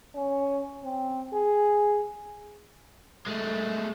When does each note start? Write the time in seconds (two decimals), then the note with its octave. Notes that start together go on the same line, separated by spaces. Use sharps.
0.15 C#4
0.83 C4
1.34 G#4
3.26 G#3 A3